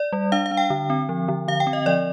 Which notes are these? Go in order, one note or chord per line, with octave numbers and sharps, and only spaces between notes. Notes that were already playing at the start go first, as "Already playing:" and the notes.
Already playing: D5
G3
D4 F5
F5
D4
G5
D3
C4
F3
D3
D3 F5
G5
C4
D#5
F3 D5